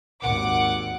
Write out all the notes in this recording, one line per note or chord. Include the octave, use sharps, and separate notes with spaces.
G#1 D#2 F#5 D6